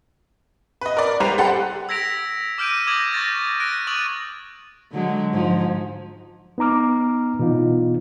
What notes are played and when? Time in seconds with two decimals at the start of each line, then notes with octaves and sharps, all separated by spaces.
0.81 B4 D#5
0.97 A#4 D5
1.20 G3 B4 C5 A#5 F7
1.38 G4 A4 F#5 C6
1.89 E6 G#6 A#6 B6 D7 F7
2.58 D6 F6 G6 D7 D#7
2.87 D6 D#6 G#6 A#6 F#7
3.13 C#6 G6 A6 A#6
3.60 F#6 A#6 D7
3.87 C#6 D#6 F#6 A6 D#7 F#7
4.92 D3 F#3 G#3
5.33 G#2 F3
6.58 B3 D#4 A#5 D6 F6
7.39 B2 E3 B3 D#4 F4